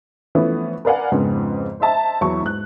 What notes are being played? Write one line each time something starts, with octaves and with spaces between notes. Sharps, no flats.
E3 F3 A3 B3 C#4
A#4 B4 D5 F5 F#5 G#5
F2 G#2 C#3 B3
C5 D#5 E5 A5 A#5
E2 F#3 E4 C#6
G#2 F#6